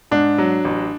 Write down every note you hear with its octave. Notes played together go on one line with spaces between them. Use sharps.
G#2 D4
F#3
A1